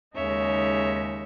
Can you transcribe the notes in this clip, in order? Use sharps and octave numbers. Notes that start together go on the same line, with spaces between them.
D#2 C#3 G#3 D#4 C#5 E5